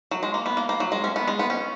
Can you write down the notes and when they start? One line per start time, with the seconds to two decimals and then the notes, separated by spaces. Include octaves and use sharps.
0.11 F#3
0.23 G#3
0.34 A#3
0.46 B3
0.57 A#3
0.69 A#3
0.80 F#3
0.92 G#3
1.04 C#4
1.16 B3
1.28 G#3
1.39 B3
1.50 C#4